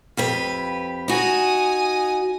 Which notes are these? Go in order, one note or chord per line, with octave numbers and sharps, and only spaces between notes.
F2 G4 B4
D#4 F#4 G#5 D#6